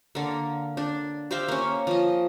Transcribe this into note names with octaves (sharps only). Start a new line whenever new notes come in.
D3 A#3
D4
G4 C5 E5 F5
A#3 C#4
F3 D#5